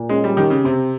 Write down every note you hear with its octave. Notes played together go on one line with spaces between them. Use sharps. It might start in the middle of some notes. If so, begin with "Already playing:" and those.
Already playing: A#2
G#3 C#4
G3
D#3 G4
C#3
C3 C4